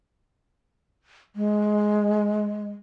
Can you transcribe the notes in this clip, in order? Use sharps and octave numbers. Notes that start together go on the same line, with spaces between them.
G#3